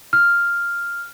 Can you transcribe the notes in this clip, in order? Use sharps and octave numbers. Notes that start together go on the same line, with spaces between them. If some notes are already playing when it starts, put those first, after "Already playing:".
F6